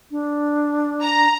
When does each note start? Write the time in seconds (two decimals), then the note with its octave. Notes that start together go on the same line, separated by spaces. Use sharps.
0.11 D4
1.02 A#5